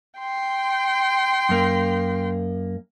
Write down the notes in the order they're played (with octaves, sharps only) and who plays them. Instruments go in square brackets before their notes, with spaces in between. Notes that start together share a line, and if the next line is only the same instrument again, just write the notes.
[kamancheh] G5 C6
[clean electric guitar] F#2 A#3